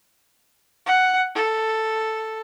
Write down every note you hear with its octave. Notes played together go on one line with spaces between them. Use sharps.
F#5
A4